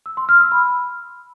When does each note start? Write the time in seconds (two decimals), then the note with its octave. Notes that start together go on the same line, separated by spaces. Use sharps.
0.06 E6
0.17 C6
0.29 F6
0.40 E6
0.52 B5